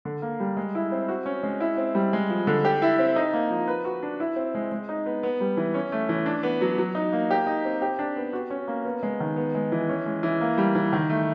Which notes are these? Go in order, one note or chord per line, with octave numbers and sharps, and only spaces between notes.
D3
A#3
G3
G#3
E4
C4
F#4
C#4
G#3
E4
C4
G3
G#3
F3
D3
G4
E4
C4
D#4
A#3
F3
B4
F#4
D4
E4
C4
G#3
G#3
D#4
B3
B3
G3
E3
C#4
A3
E3
D4
B3
F#3
F#3
D#4
A#3
G4
D#4
C4
G4
D4
B3
F#4
C#4
A#3
B3
G#3
D#3
B3
G#3
E3
C#4
G#3
E3
A#3
G3
E3
D#3
A3